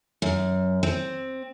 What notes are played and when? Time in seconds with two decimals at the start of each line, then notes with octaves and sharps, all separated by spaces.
0.22 F#2
0.83 C4